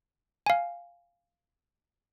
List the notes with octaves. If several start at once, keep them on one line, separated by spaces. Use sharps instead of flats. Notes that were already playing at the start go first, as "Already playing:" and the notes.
F5 G#5